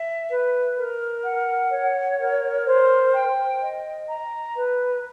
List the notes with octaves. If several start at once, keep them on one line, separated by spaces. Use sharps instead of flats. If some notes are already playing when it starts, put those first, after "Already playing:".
Already playing: E5
B4
A#4
F#5
C#5
A#4
C5
G5
D#5
A#5
B4